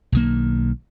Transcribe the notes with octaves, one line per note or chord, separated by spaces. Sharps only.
B1 D#3 A#3